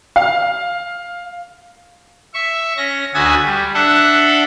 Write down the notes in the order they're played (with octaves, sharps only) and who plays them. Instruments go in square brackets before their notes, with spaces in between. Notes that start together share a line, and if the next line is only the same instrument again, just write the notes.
[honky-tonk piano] F5
[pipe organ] E5 C#6
C#4 A#6
D2 F#4 E5 G#5 D#6 A6
G3
D4 A4 E5 F#5